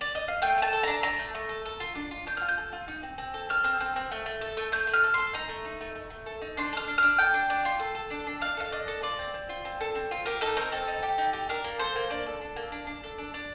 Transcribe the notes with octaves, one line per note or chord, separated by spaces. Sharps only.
D5
D#5
F5
A3 G5
A3 A5
A4
D4 A#5
D4 A#5
A3
A3
A4
A4
F4
D4
F4
D4 G6
F4 F6
G6
A4
F4
D#4
C4
C4
A4
A4 F6
C4
C4
C4
A3
A3
A4
A3
A3 G6
A3
F6
A4
A4 C6
D#4 A#5
A3
D#4
A3
A3
A3
A4
D#4
D4 C6
A4 F6
D4
D4 F6
A4 G5
D4
D4
F4
A4
A4
D4
D4
D4 F5
A4 F5
D4 D#5
A4
F4 D5
C4
C4
F4
C4
A4
C4
F4
G4 A#4
D#4 A4
C4 A#4
C4 A4
D#4
G4
D#4
G4
D4 A#4
A#3
A4 C5
A#3
D4 D5
A4
D4
A#3
D4
D4
A4
D4
D4